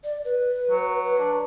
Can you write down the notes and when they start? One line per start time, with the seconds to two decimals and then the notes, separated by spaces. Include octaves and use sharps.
0.04 D5
0.25 B4
0.71 F#3
1.06 B4
1.19 D4